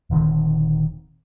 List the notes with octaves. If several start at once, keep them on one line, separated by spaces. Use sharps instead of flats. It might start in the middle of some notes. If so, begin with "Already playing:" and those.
D#1 D3 D#3 C4